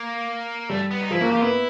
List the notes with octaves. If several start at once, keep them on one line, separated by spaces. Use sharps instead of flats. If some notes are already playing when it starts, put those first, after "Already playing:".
Already playing: A#3
G3 A3
B3
D#4
F3 E4
A#3 F#4
A#3 G4
F4
B3 E4